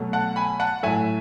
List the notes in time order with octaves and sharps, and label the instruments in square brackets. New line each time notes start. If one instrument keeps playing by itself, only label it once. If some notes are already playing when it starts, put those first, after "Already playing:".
Already playing: [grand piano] B2 F#3 A3
F#5 A5
G#5 B5
F#5 A5
A2 F#3 A3 E5 G#5